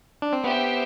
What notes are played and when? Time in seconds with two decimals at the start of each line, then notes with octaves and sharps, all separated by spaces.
0.22 D4
0.33 C4
0.44 B3 G4 C5 E5 G5